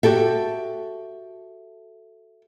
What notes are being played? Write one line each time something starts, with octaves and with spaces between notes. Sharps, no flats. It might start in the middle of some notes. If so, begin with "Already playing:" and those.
F#4 G4 A4 E5